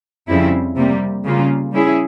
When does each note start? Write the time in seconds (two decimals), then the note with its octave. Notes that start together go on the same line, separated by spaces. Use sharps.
0.28 F2 C#3 G3 C4 E4
0.76 C3 G3 A#3
1.24 C#3 G3 A#3 F4
1.72 G3 C#4 E4 G#4